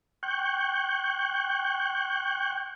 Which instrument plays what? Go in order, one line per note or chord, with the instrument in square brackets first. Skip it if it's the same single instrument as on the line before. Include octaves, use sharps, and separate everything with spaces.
[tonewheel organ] G5 C#6 F#6 G6